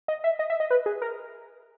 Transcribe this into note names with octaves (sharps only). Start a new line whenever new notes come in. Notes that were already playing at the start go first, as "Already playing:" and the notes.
D#5
E5
D#5
E5
D#5
B4
G#4
A#4